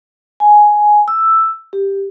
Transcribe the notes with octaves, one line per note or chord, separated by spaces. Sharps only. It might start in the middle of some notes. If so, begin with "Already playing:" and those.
G#5
E6
G4